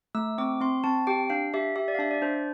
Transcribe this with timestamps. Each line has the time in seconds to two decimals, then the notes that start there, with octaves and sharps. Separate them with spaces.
0.15 A3 E6
0.38 C4 D6
0.60 C4 C6
0.84 C4 A5
1.07 G4 G5
1.30 D4 F5
1.54 G4 E5
1.76 G4 E5
1.88 D5
1.95 F5
1.99 D4 E5
2.11 D5
2.22 D4 C5